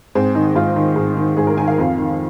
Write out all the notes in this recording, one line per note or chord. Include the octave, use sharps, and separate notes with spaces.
G#2 C4
D#3 D#4
G#2 F4
D#3
G#2
D#3
G#2 G#4
A#4
D#3 G#5
F5
F2
D#3